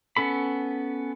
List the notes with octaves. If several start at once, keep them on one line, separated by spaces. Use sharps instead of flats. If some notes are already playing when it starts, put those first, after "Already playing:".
B3 C#4 A4 B5